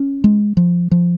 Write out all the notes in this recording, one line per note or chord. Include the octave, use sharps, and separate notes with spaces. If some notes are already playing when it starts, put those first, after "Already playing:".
Already playing: C#4
G#3
F3
F3